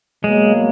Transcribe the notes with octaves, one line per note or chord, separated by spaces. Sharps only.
B2 F#3 G#3 A#3